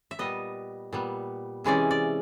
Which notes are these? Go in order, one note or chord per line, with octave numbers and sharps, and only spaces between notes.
E5
A#2 G3 B3 D#5
A#2 G3 B3
C3 E3 G#3 C#4 E4 D5
D5